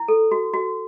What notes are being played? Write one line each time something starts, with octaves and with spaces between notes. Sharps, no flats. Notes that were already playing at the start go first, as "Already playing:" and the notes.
Already playing: E4
A4
F#4
F#4